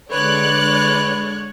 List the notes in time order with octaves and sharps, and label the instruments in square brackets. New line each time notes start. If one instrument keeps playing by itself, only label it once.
[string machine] D3 G#3 [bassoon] B4 [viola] C#5 [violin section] D5 F#6